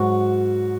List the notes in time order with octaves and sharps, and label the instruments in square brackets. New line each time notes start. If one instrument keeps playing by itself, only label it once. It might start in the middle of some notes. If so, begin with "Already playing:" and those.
Already playing: [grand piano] G#2 F#3 F#4